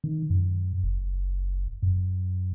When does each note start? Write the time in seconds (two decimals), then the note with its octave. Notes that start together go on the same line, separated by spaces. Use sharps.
0.04 D#3
0.30 F#2
0.83 F#1
1.83 F#2